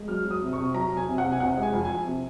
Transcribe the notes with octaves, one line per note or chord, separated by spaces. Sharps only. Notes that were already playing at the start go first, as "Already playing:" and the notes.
Already playing: G#3
F#3 F6
F#3
D#6
C3
C#6
C3
F#3 A#5
F#3
G#5
C3
F#5
C3
G#5
C3 F#5
G#3
G#5
F2
G#5
F3
C3